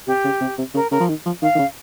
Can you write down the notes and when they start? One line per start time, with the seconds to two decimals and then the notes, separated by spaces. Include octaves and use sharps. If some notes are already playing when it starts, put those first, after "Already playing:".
0.07 C3 G4
0.24 C#3
0.41 C3
0.58 C3
0.74 C#3 A#4
0.91 C#3 A#4
1.00 F3
1.09 D#3
1.26 F3
1.42 D#3 F5
1.55 D#3
1.59 C#3